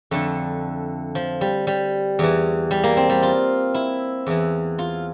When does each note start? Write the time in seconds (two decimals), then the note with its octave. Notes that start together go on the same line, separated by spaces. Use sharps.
0.11 F2 D3 A3
1.15 F3
1.41 G3
1.67 G3
2.19 E2 E3
2.71 G3
2.84 A#3
2.97 C4
3.10 G3
3.23 F4
3.74 E4
4.27 E2 E3
4.79 F4